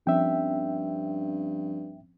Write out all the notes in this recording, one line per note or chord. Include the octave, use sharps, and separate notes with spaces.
G2 F3 C4 C#4 E5 G5